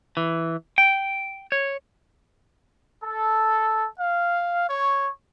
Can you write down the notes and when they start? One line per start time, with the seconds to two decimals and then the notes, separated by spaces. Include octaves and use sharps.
0.17 E3
0.78 G5
1.52 C#5
3.03 A4
3.98 F5
4.68 C#5